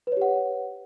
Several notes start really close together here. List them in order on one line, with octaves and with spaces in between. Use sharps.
B4 C#5 G4 F#5